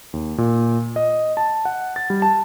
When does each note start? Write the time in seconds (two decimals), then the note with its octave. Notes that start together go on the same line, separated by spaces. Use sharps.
0.13 D#2
0.38 A#2
0.96 D#5
1.37 A5
1.65 F#5
1.96 A6
2.10 G3
2.22 A5